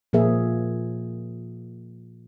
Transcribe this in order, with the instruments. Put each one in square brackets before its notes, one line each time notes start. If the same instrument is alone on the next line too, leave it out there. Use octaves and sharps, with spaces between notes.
[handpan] A#2 F3 A#3 G#4 E5